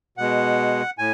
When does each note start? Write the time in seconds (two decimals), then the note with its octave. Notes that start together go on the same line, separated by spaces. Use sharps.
0.18 B2 G#3 F#5
0.98 A2 G#5